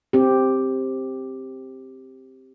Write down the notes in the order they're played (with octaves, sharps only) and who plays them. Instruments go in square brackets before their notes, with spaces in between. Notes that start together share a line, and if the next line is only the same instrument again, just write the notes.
[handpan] C4 G4